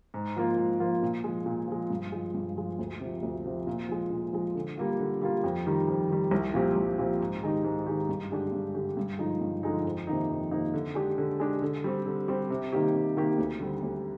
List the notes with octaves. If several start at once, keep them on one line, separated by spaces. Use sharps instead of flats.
G#2
F3 A#3 F4
G#2
F3 A#3 F4
A#2
F3 G#3
A#2
F3 G#3
G2
F3 G#3
G2
F3 G#3
D2
C3
F3
D2
C3 F3
A#2
F3 G#3
A#2
F3 G#3
D3
G3 A#3 F4
D3
G3 A#3 F4
F2
D#3 G3
F2
D#3 G3
C2
A#2 F3 C4 G4
C2
A#2 F3 C4 G4
G#2
D#3 G#3 D#4 G4
G#2
D#3 G#3 D#4 G4
G2
D3 G#3 D4 G4
G2
D3 G#3 D4 G4
G2
D3 F3 G#3 D#4
G2
D3 F3 G#3 D#4
F2
C3 D#3 A#3 D#4
F2
C3 D#3 A#3 D#4
D3
G#3 D4 G4
D3
G#3 D4 G4
D3
G3 C4 G4
D3
G3 C4 G4
C3
D#3 A#3 D#4 G4
C3
D#3 A#3 D#4 G4
D2
D3 G3 C4
D2